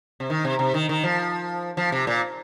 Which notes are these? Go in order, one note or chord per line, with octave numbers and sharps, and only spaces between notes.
C3
D#3
C3
C3
D#3
D#3
F3
F3
C3
A#2